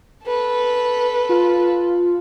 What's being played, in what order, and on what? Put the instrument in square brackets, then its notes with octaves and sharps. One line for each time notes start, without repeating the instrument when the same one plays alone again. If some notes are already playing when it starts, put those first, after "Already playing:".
[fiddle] A4 B4
[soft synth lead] F4